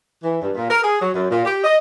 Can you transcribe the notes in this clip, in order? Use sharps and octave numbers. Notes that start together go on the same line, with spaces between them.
E3
G2
A#2
A#4
G#4
F#3
F#2
A#2
G4
D#5